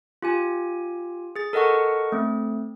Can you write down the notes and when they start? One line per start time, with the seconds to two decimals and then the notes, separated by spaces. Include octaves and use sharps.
0.22 F4 G4 G#5
1.36 G#4 A6
1.53 A4 A#4 D#5 F#5 C#6
2.12 A3 C4